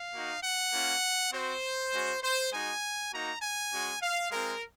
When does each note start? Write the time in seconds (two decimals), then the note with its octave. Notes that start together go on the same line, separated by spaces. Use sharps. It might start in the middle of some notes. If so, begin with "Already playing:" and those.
Already playing: F5
0.12 A#3 D#4 F#4
0.42 F#5
0.71 A#3 C#4 F4
1.32 C4 F#4 C5
1.92 G#3 C#4 F#4
2.22 C5
2.51 G#3 D#4 F#4 G#5
3.11 A#3 D#4 F#4 A#5
3.40 G#5
3.71 G#3 C#4 F#4
4.00 F5
4.30 G#3 C4 F4 A#4